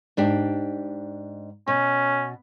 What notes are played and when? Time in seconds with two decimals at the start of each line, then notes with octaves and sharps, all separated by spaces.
0.17 G#2 D4 G4
1.68 B2 C#4